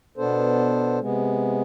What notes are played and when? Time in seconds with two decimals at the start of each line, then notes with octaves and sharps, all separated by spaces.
0.17 B2 B3 D4 A4 C5
0.99 C3 G#3 B3